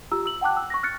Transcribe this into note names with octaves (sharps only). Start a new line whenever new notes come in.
F4 G4 A#5 E6
E6 F#7
F#5 G5 A5 D6 F#6
E6
C#6 A#6
F6 F#6 A6 C#7